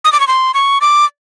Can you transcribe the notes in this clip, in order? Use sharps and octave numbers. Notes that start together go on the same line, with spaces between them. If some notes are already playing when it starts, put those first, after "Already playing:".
D#6
D6
C#6
C6
C#6
D6